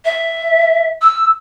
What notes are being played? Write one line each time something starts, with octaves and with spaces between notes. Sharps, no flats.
E5
E6